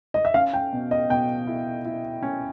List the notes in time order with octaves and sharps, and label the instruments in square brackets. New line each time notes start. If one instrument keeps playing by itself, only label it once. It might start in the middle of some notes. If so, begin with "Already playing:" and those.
[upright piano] D#5
E5
[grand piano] C#4 [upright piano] F5
[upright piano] G5
[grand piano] B2
[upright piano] D#5
[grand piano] B2 [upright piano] G5
[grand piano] E4
E4
C#4